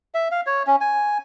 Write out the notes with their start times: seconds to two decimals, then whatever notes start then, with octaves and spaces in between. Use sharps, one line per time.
0.14 E5
0.31 F5
0.46 C#5
0.67 C#4
0.81 G#5